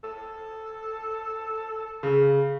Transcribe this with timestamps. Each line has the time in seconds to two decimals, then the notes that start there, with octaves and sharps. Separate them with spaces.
0.04 A4
2.03 C#3